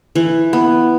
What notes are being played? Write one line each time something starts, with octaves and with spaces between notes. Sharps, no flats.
E3
B3